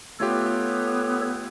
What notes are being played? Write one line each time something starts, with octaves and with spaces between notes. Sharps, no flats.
A3 B3 F4 G4 A4 C#5